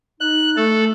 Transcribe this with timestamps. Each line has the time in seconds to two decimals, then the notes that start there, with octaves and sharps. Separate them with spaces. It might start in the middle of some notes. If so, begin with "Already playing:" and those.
0.20 D#4 F#6
0.56 A3 A4